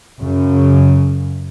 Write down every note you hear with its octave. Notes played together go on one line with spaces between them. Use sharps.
F#2 C#3